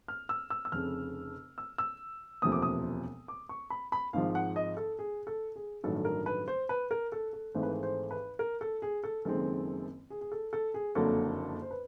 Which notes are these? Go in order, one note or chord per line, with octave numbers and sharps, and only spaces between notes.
F6
E6
E6
E6
F1 F2 C#3 F6
E6
E6
E1 D2 C3 F3 A#3 D#6
D6
D#6
D6
C#6
B5
B5
G#1 G#2 F3 F5
F#5
D#5
A4
G#4
A4
G#4
A1 G2 D#3 F#3 A3 A4
A4
A#4
B4
C5
B4
A#4
A4
A4
G#1 G#2 E3 A3 C5
B4
C5
C5
B4
A#4
A4
G#4
A4
F#1 F#2 D#3 G#3 C4 A4
G#4
G#4
A4
A4
G#4
F#1 F2 D3 F#3 A#3 A4
C5
B4